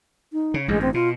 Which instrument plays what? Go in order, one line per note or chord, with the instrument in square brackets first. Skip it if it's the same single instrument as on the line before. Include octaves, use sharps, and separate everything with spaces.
[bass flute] D#4
[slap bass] C#3
[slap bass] A1 G2 [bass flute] G#3
[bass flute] C4
[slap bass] B2 [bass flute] F4